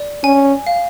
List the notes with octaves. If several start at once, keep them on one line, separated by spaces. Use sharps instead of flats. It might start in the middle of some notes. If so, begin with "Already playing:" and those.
Already playing: D5
C#4 G#5
F5